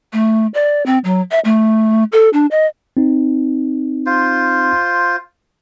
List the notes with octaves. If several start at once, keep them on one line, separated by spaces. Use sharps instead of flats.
A3
D5
C4
F#3
E5
A3
A4
D4
D#5
C4 D#4
F4 C5